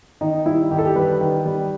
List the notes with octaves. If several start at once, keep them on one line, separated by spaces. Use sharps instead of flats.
D#3 D#4
G3 E4
D#3 G4
A4
G4
G3 B4
D#3
G3